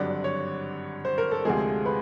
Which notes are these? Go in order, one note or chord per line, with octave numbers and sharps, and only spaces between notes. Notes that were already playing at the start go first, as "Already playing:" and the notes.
Already playing: G#1 G2 D3 F#3 D5
C#5
C5
A#4
A4
D2 C3 F3 G#3 G#4
B4